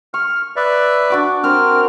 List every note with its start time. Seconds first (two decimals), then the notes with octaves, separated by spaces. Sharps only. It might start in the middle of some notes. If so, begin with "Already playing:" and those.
0.14 C#6 F6
0.56 B4 D5 E5
1.10 D4 F#4 D6
1.43 C4 D4 A#4 C5 F6